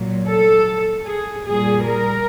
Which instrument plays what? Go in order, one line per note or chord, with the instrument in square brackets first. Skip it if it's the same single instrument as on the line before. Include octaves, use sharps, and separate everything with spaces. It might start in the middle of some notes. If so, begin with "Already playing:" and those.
Already playing: [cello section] A#2 F#3
A4
G#4
A#2 G3 G#4
A#4